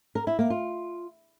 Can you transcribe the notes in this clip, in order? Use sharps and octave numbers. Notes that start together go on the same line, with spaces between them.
A#4
E4
A#3
F4